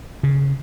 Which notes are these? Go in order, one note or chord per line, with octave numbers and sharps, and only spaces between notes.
C#3